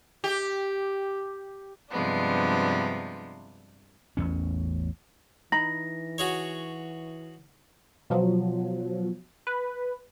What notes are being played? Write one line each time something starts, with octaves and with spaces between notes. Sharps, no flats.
G4
G2 C3 F3 G#3 B3 D4
A1 E2 C#4
E3 D#4 A#5 B5 A#6
F#4 G#4 C#5
B2 F3 F#3
B4